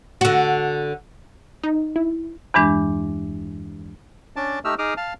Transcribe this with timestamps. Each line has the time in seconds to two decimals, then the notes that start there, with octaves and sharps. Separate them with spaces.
0.21 D3 F#4
1.64 D#4
1.96 E4
2.54 E2 G2 E3 G#3 D4
4.36 C#4 D4 D5 A5
4.65 A3 D#4 G4 E6 F6
4.79 D#4 G#4 D6 D#6 F6
4.97 F5 A5 F6